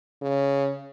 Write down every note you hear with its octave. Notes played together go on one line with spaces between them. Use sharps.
C#3